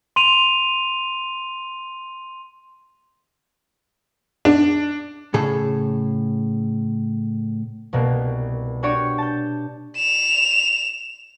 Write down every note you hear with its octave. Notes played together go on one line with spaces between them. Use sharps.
C6 D#7 F7
D4
A2 C#3 G#4 A4
C2 B2 A#3
D4 F#4 G4 C#5 D5 C#6
A5 G6
E7 F7